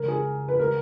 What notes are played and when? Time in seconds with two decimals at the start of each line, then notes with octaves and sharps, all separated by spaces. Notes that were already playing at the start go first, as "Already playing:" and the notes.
Already playing: C#3 G#3 C#4 A#4
0.08 G#4
0.48 B4
0.59 C#3 G#3 C#4 A#4